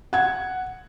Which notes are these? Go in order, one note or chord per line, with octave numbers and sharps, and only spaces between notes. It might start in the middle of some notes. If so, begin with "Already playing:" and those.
F#5 G#6